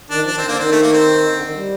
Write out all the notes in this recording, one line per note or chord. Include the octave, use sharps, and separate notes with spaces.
D#3 D4
F3
D#3 D4
D3 C4
A#3
D#3 C4
A3
A#3
C4
D3
D#3
G3